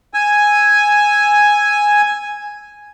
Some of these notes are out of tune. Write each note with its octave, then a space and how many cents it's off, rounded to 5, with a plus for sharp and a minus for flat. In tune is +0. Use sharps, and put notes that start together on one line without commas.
G#5 +0 E6 +0